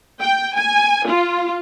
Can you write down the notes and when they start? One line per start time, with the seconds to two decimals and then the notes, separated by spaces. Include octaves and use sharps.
0.21 G5
0.57 G#5
1.08 F4